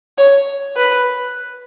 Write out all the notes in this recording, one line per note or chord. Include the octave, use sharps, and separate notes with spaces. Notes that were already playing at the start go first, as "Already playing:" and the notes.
C#5
B4